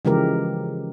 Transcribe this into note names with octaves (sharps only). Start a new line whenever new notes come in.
C#3 E3 F3 G#3 G4 A#4